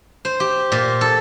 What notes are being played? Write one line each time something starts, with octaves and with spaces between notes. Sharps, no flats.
C5
G4
A#2
A4